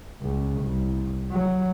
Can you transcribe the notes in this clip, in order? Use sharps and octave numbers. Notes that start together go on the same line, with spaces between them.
C#2
C2
F#3